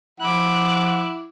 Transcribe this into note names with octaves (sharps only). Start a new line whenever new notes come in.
F3 E4 F#5 D6 F#6